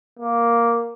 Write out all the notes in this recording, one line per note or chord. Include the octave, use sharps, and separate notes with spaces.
A#3